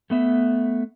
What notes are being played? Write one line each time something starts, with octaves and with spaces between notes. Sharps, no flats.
A3 B3 E5